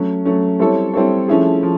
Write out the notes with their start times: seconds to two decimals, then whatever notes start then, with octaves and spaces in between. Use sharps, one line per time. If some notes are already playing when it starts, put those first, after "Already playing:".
Already playing: F#3 A3 C#4
0.25 F#3 A3 C#4
0.59 G3 C4 E4 A4 C#5
0.93 G3 C4 E4 A4 C#5
1.28 F3 A3 C#4 E4 G#4
1.63 F3